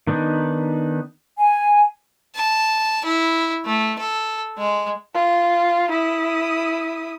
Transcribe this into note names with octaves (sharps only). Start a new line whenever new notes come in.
D#3 B3 D4 D#4
G#5
A5
E4
A3
A4
G#3
F4
E4 D#6